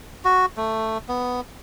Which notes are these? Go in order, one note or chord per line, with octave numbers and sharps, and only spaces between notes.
F#4
A3
B3